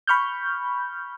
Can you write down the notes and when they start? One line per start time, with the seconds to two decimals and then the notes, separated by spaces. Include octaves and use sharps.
0.07 B5 C#6 F6 G6